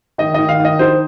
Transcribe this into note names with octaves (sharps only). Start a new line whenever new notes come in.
D#3 D#5
D#3 D#5
F5
D#3
D#5
D#4 C5